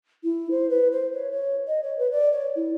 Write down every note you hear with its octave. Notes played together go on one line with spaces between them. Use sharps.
E4
C5
B4
C5
C#5
C#5
D#5
C#5
B4
D5
C#5
E4